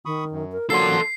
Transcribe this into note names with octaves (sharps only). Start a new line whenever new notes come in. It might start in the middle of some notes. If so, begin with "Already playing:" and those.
D#3 B5 C#6 D#6
F#2
A#4
D3 F3 F#3 A#3 A4 C6 C7